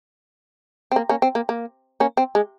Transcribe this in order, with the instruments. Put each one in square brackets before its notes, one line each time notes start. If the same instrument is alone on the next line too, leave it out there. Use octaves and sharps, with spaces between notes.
[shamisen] C4
A#3
A#3 C#4
C4
A#3
A#3
A#3 C#4
C4
G#3